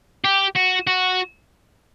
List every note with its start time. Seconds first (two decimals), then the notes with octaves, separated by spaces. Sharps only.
0.24 G4
0.56 F#4
0.87 F#4